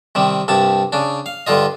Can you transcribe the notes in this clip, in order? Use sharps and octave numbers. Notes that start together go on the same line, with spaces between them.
C3 D#3 G3
C2 G2 G3 A5
C#3 D4
F5
G2 D3 F4 D#5